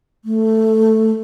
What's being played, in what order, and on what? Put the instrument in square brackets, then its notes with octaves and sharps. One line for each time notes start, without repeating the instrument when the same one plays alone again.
[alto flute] A3